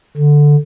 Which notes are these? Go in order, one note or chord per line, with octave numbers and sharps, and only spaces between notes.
D3